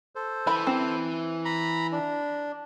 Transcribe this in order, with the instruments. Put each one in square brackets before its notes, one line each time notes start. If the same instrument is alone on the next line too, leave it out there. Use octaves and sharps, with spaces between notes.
[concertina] A4 C5
[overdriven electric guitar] E3 [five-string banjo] B5
[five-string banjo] C4
[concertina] A#5 B5
D4